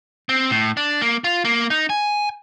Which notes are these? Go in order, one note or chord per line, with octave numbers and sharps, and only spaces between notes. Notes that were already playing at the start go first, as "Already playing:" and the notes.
C4
A2
D4
A#3
F4
A#3
D#4
G#5